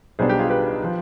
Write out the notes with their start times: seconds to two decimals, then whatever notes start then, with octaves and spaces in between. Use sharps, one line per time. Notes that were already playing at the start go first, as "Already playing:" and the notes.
0.19 B1 B2 G3 D4 G#4 C5
0.29 G4
0.39 F4 G#4
0.49 G4 B4
0.84 F3